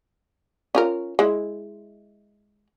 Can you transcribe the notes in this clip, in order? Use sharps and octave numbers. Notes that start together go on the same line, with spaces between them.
C#4 F4 A#4
G#3 E4